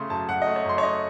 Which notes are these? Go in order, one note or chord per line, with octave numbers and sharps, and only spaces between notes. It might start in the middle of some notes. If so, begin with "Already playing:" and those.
Already playing: C#3 A3 C6
F#2 A5
F#2 F#5
D#5
A3
C#5
F#2 C6
C#5
A3 D#5